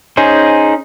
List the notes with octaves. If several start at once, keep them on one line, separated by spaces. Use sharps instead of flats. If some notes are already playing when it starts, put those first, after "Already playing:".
C#4 D#4 G#4 C5